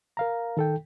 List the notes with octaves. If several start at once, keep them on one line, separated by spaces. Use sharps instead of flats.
A#4 F5 A#5
D#3 A4 G5